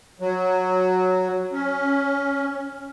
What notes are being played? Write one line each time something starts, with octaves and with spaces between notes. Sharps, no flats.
F#3
C#4